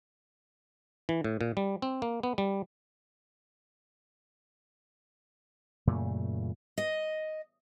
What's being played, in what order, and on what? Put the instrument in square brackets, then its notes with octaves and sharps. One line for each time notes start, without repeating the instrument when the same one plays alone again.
[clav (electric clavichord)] E3
A2
A#2
G3
C4
A#3
B3
G3
[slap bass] F#2 A#2 C#3 A3
[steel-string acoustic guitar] D#5